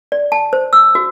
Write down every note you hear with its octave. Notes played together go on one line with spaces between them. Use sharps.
D5
A5
C5
E6
F#4